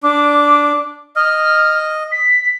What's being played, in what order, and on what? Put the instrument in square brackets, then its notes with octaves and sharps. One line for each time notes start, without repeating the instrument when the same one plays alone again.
[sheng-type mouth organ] D4 [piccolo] D6
[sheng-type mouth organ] D#5 [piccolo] F6
[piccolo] B6